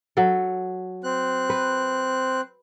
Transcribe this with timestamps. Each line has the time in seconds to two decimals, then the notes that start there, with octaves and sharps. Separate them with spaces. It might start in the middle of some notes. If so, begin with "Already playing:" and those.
0.17 F#3 A4
1.04 C4 F#6
1.50 B4